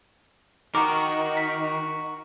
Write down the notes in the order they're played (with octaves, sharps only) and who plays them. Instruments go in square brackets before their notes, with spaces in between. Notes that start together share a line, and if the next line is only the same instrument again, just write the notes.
[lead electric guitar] D#3 [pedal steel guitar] F#4 A#4 [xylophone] A#5 D6
[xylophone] B6